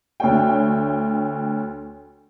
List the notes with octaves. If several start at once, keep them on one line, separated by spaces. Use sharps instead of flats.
D2 C#5 G5